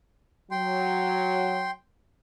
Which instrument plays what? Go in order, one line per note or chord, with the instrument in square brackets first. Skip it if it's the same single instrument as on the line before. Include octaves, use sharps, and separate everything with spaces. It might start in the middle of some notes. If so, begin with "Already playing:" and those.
[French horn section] F#3 [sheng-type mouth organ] G5 C6